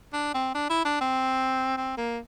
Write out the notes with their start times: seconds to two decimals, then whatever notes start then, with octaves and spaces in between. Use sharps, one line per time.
0.13 D4
0.34 C4
0.54 D4
0.70 E4
0.85 D4
1.01 C4
1.77 C4
1.97 A#3